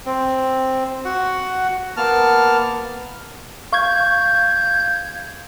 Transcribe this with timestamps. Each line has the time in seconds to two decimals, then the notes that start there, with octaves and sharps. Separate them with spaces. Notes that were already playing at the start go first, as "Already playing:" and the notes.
0.06 C4
1.05 F#4 F#5
1.97 A#3 B3 A5 F6
3.72 F5 C#6 G6 G#6